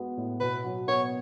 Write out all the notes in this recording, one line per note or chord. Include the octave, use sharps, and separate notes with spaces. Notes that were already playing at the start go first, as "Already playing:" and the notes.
Already playing: G#3 B3 F#4
A2
B2 B4
F#3
B3 C#5